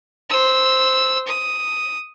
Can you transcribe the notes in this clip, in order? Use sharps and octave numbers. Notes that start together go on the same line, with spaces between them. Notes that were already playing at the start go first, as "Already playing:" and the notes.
C5 E6
D#6